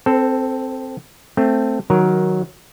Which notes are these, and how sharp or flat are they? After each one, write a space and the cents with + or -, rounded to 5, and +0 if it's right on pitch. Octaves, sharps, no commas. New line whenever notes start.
C4 +0 A4 +0 C5 -35
A3 +10 C4 +0
D#3 +0 F#3 +0 A#4 +10